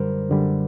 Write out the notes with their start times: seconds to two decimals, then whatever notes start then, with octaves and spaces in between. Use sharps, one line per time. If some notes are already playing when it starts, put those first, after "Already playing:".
Already playing: F#2 D3 G3 A#4 C5
0.29 F#2 D3 G3